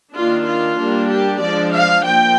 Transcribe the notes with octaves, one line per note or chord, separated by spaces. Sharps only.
D#3 A#3 D4 F4
F4
G3 A#3 D4
G4
F3 G#3 D4 D5
F5
F3 A#3 G5